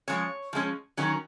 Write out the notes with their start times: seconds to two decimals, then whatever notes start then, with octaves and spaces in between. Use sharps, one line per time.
0.08 F3 G#3 C#4 C#5
0.53 F3 G#3 C#4
0.97 D#3 F#3 C#4